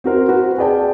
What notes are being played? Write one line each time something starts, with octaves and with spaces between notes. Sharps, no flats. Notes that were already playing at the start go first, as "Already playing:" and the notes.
C4 F#4 A#4 C5
F#4 B4
G#4 B4 D5 G5 A5